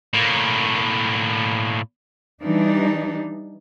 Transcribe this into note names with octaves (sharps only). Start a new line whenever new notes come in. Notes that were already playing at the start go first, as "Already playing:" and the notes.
A2 A#3
E3 G3 D4 D#4